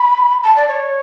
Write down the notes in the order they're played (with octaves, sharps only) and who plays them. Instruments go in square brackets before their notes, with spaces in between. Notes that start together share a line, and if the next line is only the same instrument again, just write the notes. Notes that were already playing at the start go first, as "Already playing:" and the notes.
Already playing: [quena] B5
A5
D5
C#5